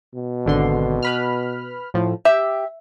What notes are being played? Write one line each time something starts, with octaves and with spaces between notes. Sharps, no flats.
B2
G#1 D3 C6
B4 B5 F6
A2 F3
G4 E5